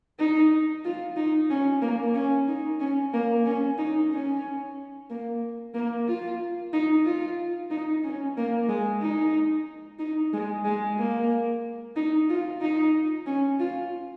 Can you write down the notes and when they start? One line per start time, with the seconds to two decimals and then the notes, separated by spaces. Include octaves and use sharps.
0.19 D#4
0.85 F4
1.16 D#4
1.50 C#4
1.82 A#3
2.14 C#4
2.48 D#4
2.80 C#4
3.13 A#3
3.46 C#4
3.78 D#4
4.12 C#4
5.10 A#3
5.74 A#3
6.07 F4
6.73 D#4
7.05 F4
7.70 D#4
8.04 C#4
8.37 A#3
8.68 G#3
9.02 D#4
9.99 D#4
10.33 G#3
10.65 G#3
10.98 A#3
11.96 D#4
12.29 F4
12.61 D#4
13.26 C#4
13.59 F4